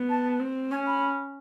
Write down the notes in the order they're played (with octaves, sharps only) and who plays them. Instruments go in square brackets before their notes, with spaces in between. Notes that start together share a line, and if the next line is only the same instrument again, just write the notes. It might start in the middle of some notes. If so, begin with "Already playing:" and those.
Already playing: [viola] B3
[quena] A5
[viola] C4
[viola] C#4 [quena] G#5
[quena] B5